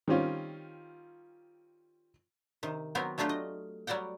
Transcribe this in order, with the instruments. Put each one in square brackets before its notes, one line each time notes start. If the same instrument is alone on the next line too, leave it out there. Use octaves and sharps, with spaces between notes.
[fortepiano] D#3 G3 C4 C#4 F4
[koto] C3 D#3
F#3 B3 C4 A#4
F#3 A3 D4 F4 G4
D#5
F#3 G3 D5 F#5 G5